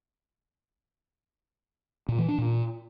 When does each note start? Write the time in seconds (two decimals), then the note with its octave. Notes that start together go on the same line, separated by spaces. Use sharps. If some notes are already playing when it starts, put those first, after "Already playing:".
2.09 A#2
2.18 E3
2.28 D4
2.38 A#2